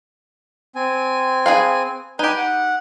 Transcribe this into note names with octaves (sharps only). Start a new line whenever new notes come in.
C4 G#5
G#4 B4 F5
D#4 G4 B4 G#5
F#5